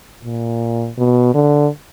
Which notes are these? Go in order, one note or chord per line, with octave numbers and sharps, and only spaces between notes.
A#2
B2
D3